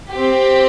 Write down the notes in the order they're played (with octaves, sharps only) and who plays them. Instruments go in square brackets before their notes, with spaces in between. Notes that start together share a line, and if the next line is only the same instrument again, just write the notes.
[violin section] C4 G4